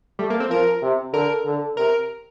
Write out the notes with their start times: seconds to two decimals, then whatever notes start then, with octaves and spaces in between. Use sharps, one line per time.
0.19 G3 A3
0.30 A#3
0.40 C4
0.50 F3 A#4
0.82 C3
1.14 D3 A#4
1.46 D3
1.77 C3 A#4